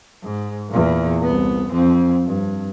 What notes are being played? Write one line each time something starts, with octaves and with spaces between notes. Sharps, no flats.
G#2
E2 A#2
C2 B3
F2 C4
G2